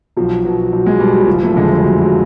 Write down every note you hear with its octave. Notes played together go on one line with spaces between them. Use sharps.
B1 F3
B2 F#3
B1
G#3
B2 G3
F#3
F#1 F3
A3
F2 D3 G#3
G3
F#1 F#3
F#3